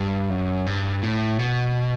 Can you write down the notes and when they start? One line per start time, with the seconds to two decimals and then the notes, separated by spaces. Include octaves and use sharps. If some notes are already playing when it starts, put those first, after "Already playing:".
Already playing: G2
0.29 F#2
0.66 G2
1.03 A2
1.39 B2